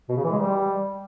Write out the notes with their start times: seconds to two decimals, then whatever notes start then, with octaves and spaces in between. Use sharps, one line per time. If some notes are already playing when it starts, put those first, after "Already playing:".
0.09 B2
0.17 C#3
0.24 E3
0.31 G#3
0.39 G3